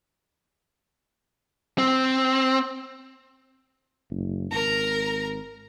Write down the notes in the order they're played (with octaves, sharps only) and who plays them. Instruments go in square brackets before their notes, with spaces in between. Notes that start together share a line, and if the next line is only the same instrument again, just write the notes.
[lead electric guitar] C4
[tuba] F#1
[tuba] G#1 [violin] A#4 A#5